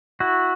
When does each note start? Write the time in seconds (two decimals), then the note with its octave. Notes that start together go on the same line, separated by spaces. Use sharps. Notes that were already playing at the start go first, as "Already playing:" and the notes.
0.20 E4 F#4